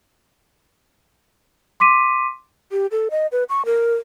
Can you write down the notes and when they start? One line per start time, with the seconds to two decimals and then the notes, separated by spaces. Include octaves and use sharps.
1.80 C6 D6 B6 D#7
2.72 G4
2.91 A4
3.11 D#5
3.32 B4
3.49 C#6
3.66 A#4